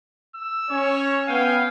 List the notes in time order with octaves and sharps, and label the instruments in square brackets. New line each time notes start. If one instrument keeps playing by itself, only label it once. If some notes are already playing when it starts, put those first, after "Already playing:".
[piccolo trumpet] E6
[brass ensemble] C#4 C#5
[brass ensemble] B3 G5 G#5 [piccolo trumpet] F5